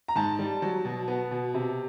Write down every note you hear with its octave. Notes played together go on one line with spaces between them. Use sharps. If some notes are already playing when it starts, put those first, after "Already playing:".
A#5
G#2 A5
G3
F#3
B2
B3
B2
C3